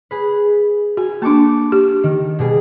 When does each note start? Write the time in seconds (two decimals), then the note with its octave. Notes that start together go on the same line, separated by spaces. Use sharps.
0.11 G#4 B4
0.97 F#4 G#5
1.22 A#3 D4 A5 C#6 D6
1.72 G4
2.03 D#3
2.39 B2 G3 G#4